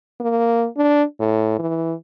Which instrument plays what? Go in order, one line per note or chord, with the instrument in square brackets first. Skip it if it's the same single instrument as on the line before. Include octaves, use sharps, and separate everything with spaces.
[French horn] A#3
D4
A2
E3